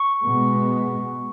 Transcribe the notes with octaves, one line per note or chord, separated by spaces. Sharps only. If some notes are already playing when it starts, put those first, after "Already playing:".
Already playing: C#6
B2 G#3 B3